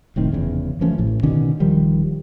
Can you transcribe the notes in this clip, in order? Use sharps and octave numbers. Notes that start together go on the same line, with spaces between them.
F1 A2 D#3 C4
F1 E2 C#3
E3 F3 A3 C#4
A1 A2
B2 D3 D#3 C#4
D#1 D#3 F3 G3